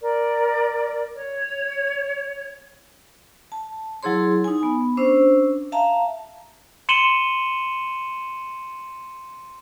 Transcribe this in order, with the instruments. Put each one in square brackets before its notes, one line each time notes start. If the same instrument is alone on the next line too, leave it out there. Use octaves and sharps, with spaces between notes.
[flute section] A#4 D5
C#5
[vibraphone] A5
F#3 E4 G#4 C#5 C6
D#4 G#5
B3
C#4 D4 C5 E6
E5 F5 A5 A#5
[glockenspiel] C6 C#7 D#7 E7 F#7 G7